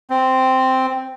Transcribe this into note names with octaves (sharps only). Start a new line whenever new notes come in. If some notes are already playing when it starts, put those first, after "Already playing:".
C4